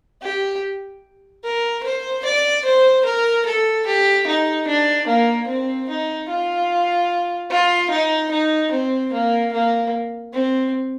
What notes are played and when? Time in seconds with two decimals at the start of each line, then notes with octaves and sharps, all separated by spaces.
0.22 G4
1.44 A#4
1.83 C5
2.25 D5
2.65 C5
3.05 A#4
3.46 A4
3.87 G4
4.27 D#4
4.67 D4
5.07 A#3
5.47 C4
5.89 D#4
6.29 F4
7.50 F4
7.90 D#4
8.31 D#4
8.72 C4
9.13 A#3
9.53 A#3
10.33 C4